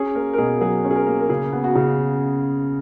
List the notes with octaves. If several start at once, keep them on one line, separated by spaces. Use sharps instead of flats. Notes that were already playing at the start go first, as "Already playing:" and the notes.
Already playing: C#4 G#4
A#3 A#4
A#4
B2 G#4
F#3 G#4
C#4
G#4
A#4
A#3
A#4
C#3 G#4
B3
F#4
C#3